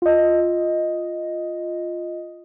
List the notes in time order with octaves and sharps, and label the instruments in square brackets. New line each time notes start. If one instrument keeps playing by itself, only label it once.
[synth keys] F4 D#5